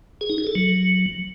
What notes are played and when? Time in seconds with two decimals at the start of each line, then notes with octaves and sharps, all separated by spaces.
0.21 G#4
0.30 D#4
0.38 G#4
0.47 A4
0.55 F#3